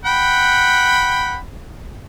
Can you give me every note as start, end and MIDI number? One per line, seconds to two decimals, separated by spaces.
0.05 1.37 78
0.05 1.37 79
0.05 1.37 83